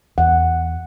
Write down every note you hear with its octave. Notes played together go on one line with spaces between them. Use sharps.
E2 F#5